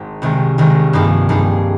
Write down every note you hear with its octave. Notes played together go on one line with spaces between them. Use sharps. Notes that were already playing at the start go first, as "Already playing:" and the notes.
Already playing: G#1 G#2
C2 C3 D#3 G#3
C2 C3 D#3 G#3
G2 F3 A#3 D#4 G#4
G2 F3 A#3 D#4 G#4